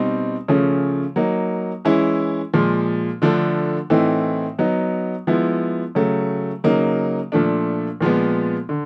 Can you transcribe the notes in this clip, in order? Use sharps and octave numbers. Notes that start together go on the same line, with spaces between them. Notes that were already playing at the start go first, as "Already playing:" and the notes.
Already playing: B2 G3 C4 D#4
C#3 F3 A3 C#4
F#3 A#3 D#4
E3 G#3 C#4 E4
A#2 F3 G#3
D3 F3 A3 D4
A2 E3 A3 C4 D#4
F#3 B3 D#4
F3 G#3 B3 E4
C#3 F#3 A3
C#3 F#3 A#3 D#4
A#2 F3 A3 D4
A#2 F3 G#3 B3
D3